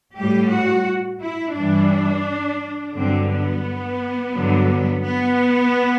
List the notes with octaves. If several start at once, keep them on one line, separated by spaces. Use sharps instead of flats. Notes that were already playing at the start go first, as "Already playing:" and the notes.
A2 G3 G4
F#4
E4
G2 E3 G3 D4
G2 D3 F#3 C4
B3
G2 D3 F#3
B3